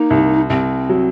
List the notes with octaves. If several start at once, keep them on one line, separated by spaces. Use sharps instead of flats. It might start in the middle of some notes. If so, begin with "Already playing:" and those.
Already playing: A#3 D#4
C2
C2 C4
F#3